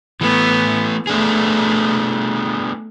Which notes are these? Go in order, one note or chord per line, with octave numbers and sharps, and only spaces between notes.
E3 A3 B3
A3 B3 D4 G#4